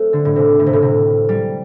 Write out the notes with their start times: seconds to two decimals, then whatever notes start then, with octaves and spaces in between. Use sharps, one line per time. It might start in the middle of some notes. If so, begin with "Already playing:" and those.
Already playing: A3 C4
0.13 D3
0.25 A2
0.36 C3
0.59 A2
0.66 C3
0.73 A2
0.82 C3
1.29 G3